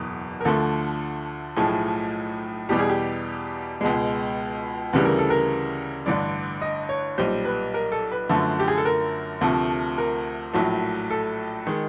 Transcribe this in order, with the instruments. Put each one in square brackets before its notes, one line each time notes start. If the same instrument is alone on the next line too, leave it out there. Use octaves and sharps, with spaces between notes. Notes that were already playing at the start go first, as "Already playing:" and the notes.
Already playing: [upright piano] F#1 E2 B2
A#4
D2 D3 F3 A3 A4
B1 A2 F3 A3 G#4
E2 B2 G3 G4
G#4
G4
C#2 B2 G#3
D2 C#3 E3 G3 B4
A#4
A4
A#4
A1 G2 D3 D5
D#5
C#5
B1 A#2 G3 C5
B4
A#4
A4
B4
F#2 D3 F3 A3
G4
G#4
A4
A#4
D2 C3 F3 A3
A#4
A#1 A2 F#3 A3
A4
D#3 G#3